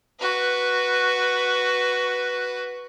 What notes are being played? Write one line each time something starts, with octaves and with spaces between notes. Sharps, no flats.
F#4 B4